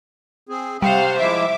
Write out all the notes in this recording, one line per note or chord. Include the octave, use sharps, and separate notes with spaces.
C4 G#4
C3 G3 C5 F5 F#5
F3 G#3 E4 E5 D6